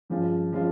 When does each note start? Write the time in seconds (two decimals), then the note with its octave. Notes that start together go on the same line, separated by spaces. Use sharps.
0.10 G2 F3 G#3 C#4 F4
0.52 F3 G#3 C#4 F4